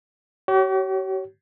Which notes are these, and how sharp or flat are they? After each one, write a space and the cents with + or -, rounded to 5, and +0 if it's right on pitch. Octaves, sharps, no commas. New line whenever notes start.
G4 -45 C#5 +0